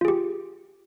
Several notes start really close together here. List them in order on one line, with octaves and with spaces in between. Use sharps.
F4 G#4 G4